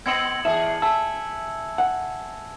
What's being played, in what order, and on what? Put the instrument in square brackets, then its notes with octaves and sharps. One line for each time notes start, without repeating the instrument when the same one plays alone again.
[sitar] B3 C4 D#5 [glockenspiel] G#6 C#7 F#7
[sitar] E2 G#4 [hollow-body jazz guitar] E5 [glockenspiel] A5
[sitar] E5 [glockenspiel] G#5 E6 [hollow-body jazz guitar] A5
[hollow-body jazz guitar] F#5